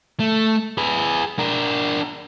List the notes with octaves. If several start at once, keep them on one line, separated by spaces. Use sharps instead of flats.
A3
G#4 B4
D4 A#4